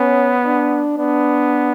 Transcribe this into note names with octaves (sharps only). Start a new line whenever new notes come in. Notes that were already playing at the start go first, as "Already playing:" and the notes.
Already playing: B3 C#4
D4
B3 D4